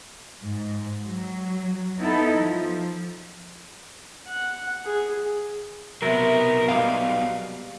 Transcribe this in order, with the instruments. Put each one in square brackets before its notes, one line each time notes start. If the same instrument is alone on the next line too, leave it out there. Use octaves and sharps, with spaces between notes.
[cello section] G#2
F#3
B3 D#4 E4 A4
F3
[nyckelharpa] F#5
G#4
[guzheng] C3 [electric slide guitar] F#3 B3 [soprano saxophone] A#4
[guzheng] G3 G#3 A#3 [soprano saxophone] F5